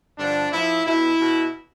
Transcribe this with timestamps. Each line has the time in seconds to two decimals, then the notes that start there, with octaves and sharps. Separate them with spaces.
0.19 G2 D3 F3 D4
0.53 A2 F3 E4
0.86 B2 E4
1.20 B2